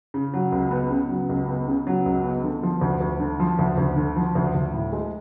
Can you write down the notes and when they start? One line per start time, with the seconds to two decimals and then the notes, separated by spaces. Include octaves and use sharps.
0.14 C#3
0.34 F#3
0.52 C#2
0.71 B3
0.91 C#3
1.09 F#3
1.29 C#2
1.48 B3
1.68 C#3
1.87 F#3
2.06 C#2
2.24 B3
2.44 D3
2.63 F3
2.81 D2
3.00 D2
3.20 D3
3.40 F3
3.59 D2
3.78 D2
3.96 D3
4.16 F3
4.35 D2
4.55 D2
4.73 A2
4.93 G#3